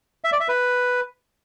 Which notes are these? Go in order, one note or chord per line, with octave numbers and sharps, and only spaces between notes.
E5
D5
E5
B4